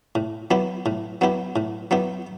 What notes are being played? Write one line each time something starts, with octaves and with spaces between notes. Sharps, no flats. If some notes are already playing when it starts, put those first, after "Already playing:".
A2
F#3 B3 E4 G4
A2
F#3 B3 E4 G4
A2
F#3 B3 E4 G4